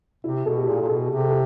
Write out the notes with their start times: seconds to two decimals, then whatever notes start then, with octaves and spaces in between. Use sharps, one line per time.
0.24 C3 E4
0.45 B2 A4
0.57 G4
0.67 A#2 G#4
0.81 A#2
0.88 B2 A4
1.09 C3
1.30 A4